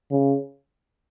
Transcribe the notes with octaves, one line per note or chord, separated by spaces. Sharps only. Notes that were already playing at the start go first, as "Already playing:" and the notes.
C#3